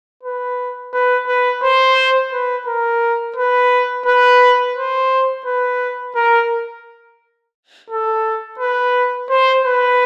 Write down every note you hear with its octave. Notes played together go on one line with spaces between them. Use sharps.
B4
B4
B4
C5
B4
A#4
B4
B4
C5
B4
A#4
A4
B4
C5
B4